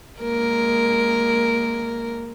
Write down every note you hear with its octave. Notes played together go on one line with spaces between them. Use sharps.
G#3 A#3 A#4